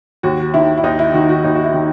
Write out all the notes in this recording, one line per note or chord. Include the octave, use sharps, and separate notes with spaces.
D#2 F#4
D#3 E4
E4
D#2 D#4
E4
D#3 F#4
F#4
D#2 D#4
F#4
E4
D#3